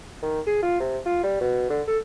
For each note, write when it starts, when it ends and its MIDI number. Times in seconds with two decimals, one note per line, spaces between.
0.22 0.40 51
0.47 0.59 68
0.62 0.79 65
0.80 0.98 48
1.06 1.22 65
1.23 1.39 55
1.41 1.66 47
1.70 1.82 50
1.88 1.98 69